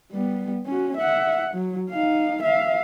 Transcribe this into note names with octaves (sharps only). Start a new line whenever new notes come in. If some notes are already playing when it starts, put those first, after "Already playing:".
G3 B3
C#4 F#4
E5 F#5
F#3
D#4 F5
E5 F5